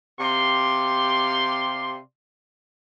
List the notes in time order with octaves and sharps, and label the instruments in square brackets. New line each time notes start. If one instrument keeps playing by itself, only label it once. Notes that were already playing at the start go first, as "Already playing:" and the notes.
[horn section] C3 G4 D5 F5 C6